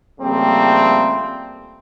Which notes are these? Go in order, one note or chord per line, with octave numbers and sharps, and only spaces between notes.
C#3 F3 G3 A3 A#3 C4